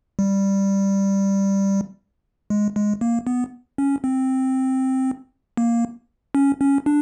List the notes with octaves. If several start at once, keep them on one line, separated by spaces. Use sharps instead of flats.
G3
G#3
G#3
A#3
B3
C#4
C4
A#3
C#4
C#4
D4